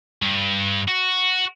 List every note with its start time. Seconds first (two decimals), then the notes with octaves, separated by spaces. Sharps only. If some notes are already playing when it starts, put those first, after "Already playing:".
0.22 G2
0.88 F#4